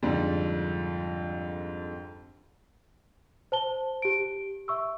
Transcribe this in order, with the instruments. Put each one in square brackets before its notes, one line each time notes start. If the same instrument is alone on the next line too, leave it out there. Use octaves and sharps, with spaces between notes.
[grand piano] F2 G#2 D3 G3
[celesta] C5 A5 G7
G4 D7
E5 C#6 E6